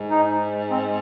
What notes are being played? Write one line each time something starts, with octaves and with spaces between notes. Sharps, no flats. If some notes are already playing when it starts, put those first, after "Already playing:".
Already playing: G#2
D#4
C4